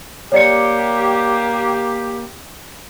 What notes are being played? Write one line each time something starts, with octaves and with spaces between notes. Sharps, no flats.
A#3 G4 C#5 D5 C#7